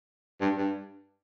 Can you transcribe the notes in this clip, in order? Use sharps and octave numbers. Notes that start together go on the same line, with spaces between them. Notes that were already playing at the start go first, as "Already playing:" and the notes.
G2
G2